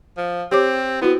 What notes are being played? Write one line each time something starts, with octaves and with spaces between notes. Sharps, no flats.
F3
C4 G4 C#5 D6
B3 E4 F#4